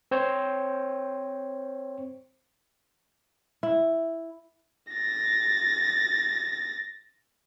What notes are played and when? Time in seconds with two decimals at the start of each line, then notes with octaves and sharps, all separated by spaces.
0.11 C4 C5 C#5
3.63 E4
4.93 A6 A#6